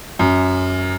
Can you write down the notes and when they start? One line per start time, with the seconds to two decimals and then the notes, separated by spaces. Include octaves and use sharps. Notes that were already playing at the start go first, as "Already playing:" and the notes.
0.19 F#2